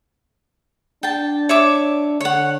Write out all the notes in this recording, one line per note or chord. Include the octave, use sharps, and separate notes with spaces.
D4 G5 A5
C#5 E5 D6
D3 C#5 F#5